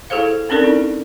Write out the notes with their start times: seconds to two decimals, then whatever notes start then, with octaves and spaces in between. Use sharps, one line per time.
0.10 E4 G#4 A4 C5 F5
0.49 C4 C#4 D#4 A4 A#4 D5
0.63 D#4 E4